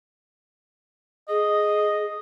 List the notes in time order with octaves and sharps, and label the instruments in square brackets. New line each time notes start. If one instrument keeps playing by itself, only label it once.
[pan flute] G#4 [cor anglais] D#5